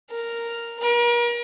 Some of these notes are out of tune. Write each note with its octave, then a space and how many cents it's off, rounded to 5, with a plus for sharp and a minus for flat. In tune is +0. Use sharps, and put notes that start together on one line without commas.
A#4 +0
A#4 +40